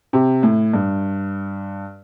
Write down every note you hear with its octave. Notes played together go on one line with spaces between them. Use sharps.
C3
A2
G2